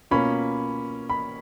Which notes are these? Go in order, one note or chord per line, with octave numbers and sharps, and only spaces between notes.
B2 A#3 C#4 F4 B5
B5